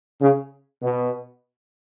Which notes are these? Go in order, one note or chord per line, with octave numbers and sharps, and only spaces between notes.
C#3
B2